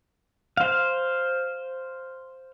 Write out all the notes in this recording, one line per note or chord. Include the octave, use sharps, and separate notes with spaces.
C5 F5